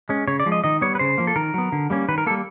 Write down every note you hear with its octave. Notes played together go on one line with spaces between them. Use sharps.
G#3 C#4
C#3 C#5
D5
F3 G#3
D#5
D#3 D#5
G3 B3 C#5
B4
C#3 C5
F3 A#3
A4
D#3 A#4
F#3 B3
D3
G3 A#3 C#4
D#3 B4
A#4
G3 A#3 A4